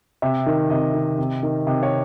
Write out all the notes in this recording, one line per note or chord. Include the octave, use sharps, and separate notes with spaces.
C3 E5
D#3
C3 D#5
D#3
C3
D#3
C3 D#5
C#5